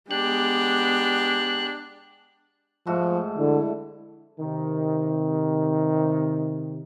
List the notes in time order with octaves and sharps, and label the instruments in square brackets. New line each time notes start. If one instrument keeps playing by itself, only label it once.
[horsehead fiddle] G#3 B3 [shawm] D4 [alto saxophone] G4 [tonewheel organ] F#6
[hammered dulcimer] G#2 A3 F#4 [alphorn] F3
[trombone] D3 [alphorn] E4
[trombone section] C3 D#3